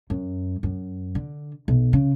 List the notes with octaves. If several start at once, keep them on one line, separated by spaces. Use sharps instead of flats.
F#2
F#2
D3
B1
C#3